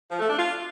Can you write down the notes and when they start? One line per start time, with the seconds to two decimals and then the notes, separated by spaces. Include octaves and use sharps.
0.10 F3
0.19 A3
0.29 D4
0.38 F4